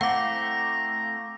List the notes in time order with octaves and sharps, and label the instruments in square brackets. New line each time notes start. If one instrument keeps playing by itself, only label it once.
[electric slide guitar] A3 C4 E4 [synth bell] F5 D6 [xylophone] F#5 [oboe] A#5